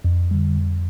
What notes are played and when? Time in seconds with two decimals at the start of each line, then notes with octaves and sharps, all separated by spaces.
0.05 F2
0.31 D3 G3
0.56 F2